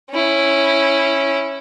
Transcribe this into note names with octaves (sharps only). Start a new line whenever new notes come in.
C#4 E4